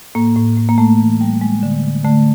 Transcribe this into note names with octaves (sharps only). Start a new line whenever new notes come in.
A2 A#3
A2
A2
A#3
A2 A3
E3
G3
G3 G#3
D3
D3
D3 A3